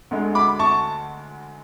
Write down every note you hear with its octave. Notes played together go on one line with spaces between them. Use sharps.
D2 D3 G#3
B5 D6
A5 C#6